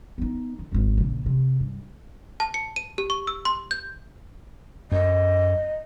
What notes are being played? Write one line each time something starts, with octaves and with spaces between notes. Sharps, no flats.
B3 D#4
D3
D1 G#1
A#1 C#3
C3
G2
A5
C#7
D#7
G4
C#6
E6
C6
G6
F#2 D#5